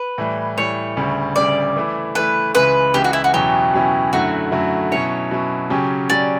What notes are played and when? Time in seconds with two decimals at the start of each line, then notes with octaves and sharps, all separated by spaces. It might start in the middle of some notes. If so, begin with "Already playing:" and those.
Already playing: B4
0.18 A2 E3 G3
0.57 A2 E3 G3 C#5
0.97 D2 C#3 G3
1.36 D2 C#3 G3 D5
1.76 E3 A3 E4
2.15 E3 A3 E4 B4
2.54 C#2 C#3 E3 B4
2.94 C#2 C#3 E3 G4
3.04 F#4
3.13 E4
3.24 F#4
3.33 E2 B2 F#3 C#4 E4 G4
3.73 E2 B2 F#3 C#4 E4
4.13 F#2 D3 F#3 A3 E4 F#4
4.52 F#2 D3 F#3 A3 E4
4.91 B2 F#3 C#4 E4 C#5
5.31 B2 F#3 C#4 E4
5.70 C#3 F#3 C#4 G4
6.10 C#3 F#3 C#4 G4 D5